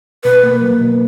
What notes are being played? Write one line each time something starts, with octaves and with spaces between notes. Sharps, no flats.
B2 B4
A#3
F#3
B2